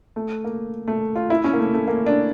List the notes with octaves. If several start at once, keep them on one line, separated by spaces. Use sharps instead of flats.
A3
A#3
A3
F4
E4
C#4
A#3
A3
A3
A#3
D4